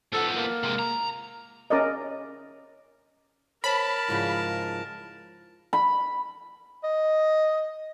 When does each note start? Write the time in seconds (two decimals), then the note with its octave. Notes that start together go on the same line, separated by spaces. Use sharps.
0.13 F3 B3 A4
0.35 A#3
0.63 C3 G#3
0.79 A#5
1.70 C#4 A#4 D5 D#5
3.64 A#4 C5 C#5 A5 B5
4.08 G#2 C#3 F3 E4 F4 G#4
5.73 B5
6.84 D#5